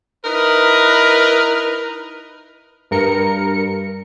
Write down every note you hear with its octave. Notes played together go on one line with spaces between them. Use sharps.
D#4 E4 A#4 B4
G2 A#4 C#7